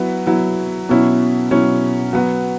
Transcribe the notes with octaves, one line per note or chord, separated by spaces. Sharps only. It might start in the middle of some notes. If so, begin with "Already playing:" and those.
Already playing: F#3 B3 E4
F#3 B3 E4
B2 F#3 C#4 E4
B2 F#3 C#4 E4
F#3 B3 F#4